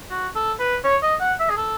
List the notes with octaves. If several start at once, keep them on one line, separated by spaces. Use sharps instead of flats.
F#4
A4
B4
C#5
D#5
F#5
E5
G#4
A4